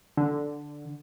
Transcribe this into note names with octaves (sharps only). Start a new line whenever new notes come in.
D3